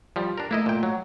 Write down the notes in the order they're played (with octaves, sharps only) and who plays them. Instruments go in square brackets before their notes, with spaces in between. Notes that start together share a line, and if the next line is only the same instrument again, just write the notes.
[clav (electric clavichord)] F3 G3
D4 A#4
[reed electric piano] A3 [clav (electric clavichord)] A#3 E4 D#5
[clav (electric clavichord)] A#2 G5
F#3